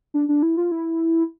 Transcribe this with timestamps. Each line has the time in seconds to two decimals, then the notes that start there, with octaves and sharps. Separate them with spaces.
0.14 D4
0.29 D4
0.43 E4
0.57 F4
0.72 E4